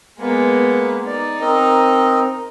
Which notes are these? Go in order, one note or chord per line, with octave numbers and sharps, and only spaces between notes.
G#3 A#3 B3
D#4 D5
C4 A#4 D#5